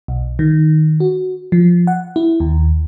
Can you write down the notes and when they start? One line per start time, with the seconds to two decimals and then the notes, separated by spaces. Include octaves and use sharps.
0.08 B1
0.39 D#3
1.00 F#4
1.52 F3
1.87 F#5
2.16 E4
2.40 D#2